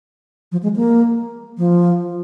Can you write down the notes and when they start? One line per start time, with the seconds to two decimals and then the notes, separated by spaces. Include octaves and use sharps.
0.52 F3
0.63 G#3
0.76 A#3
1.58 F3